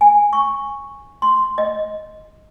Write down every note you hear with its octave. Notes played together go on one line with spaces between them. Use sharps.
G#5
C#6
C6
D#5